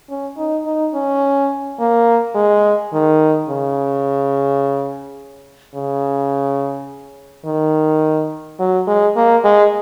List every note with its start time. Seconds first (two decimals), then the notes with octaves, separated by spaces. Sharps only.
0.10 C#4
0.37 D#4
0.65 D#4
0.94 C#4
1.80 A#3
2.35 G#3
2.93 D#3
3.49 C#3
5.75 C#3
7.46 D#3
8.60 F#3
8.87 G#3
9.16 A#3
9.44 G#3